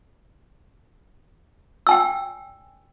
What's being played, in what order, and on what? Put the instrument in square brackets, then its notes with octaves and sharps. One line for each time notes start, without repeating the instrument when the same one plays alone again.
[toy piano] G5 G#5 E6